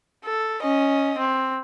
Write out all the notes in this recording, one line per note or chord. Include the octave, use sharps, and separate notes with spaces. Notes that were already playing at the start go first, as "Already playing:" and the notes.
A4
C#4 D#5
C4